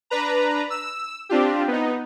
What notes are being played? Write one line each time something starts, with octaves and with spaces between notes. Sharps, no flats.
D4 B4 A#5
E6
C4 D4 F4 G4
B3 D#4